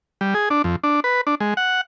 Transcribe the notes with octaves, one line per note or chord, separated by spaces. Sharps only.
G3
G#4
D4
F2
D4
B4
D4
G#3
F#5